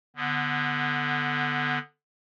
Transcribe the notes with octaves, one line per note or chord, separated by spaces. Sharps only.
D3 B3